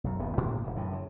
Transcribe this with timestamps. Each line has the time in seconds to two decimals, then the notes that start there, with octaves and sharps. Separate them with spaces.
0.04 B1 F#2
0.19 D#1 D#2 B3
0.37 A1 A2 A#3
0.64 E1 C#3
0.75 F#2 A2 C3 E3
0.93 C#3